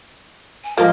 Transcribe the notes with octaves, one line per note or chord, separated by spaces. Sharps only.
G#5
G#2 F3 A#3 D#5